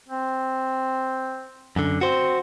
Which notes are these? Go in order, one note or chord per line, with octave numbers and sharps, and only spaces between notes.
C4
F#2 D3
C4 F#4 C5